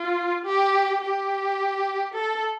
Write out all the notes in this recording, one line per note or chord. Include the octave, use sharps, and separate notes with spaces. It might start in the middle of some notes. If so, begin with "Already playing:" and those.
Already playing: F4
G4
G4
A4